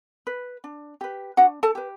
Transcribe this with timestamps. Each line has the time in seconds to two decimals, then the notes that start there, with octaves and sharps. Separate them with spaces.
0.27 B4
0.64 D4
1.01 G4 B4
1.37 D4 F#4 F#5
1.63 A4 A5
1.75 G4 B4